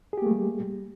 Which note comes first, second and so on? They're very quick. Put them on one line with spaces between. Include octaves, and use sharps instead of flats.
G#4 G4 A#3 A3 G3